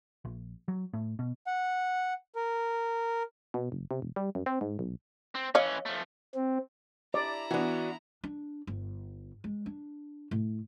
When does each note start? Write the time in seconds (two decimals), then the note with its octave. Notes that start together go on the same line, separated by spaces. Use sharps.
0.25 A#1
0.68 F#3
0.94 A2
1.19 B2
1.47 F#5
2.35 A#4
3.54 B2
3.72 F#1
3.91 C3
4.02 E1
4.16 G3
4.35 F#2
4.46 C4
4.61 G#2
4.79 B1
5.35 C4
5.55 E3 C#4 C#5 D#5 F5
5.86 F3 A3
6.35 C4
7.14 E4 D5 A#5
7.51 E3 B3 D4 F#4
8.24 D4
8.67 G1
9.44 G#3
9.66 D4
10.31 A2